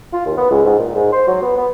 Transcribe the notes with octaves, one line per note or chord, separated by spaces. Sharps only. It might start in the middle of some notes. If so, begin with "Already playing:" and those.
F4
D#2
B3
C#2
G#2
A#2
G#2
C5
F#3
B3
B3